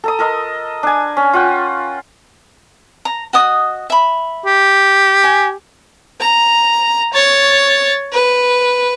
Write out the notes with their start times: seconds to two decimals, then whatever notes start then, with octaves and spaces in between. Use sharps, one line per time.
0.04 A4 A#5 D#6
0.19 A4 A#4 D#5 C6
0.83 D4 G#5
1.17 C#4
1.33 F4 F#5 G5
3.05 A#5
3.33 F#4 D#5 D#6
3.90 E5 B5
4.46 G4
5.24 G#5
6.20 A#5
7.14 C#5 A6
8.13 B4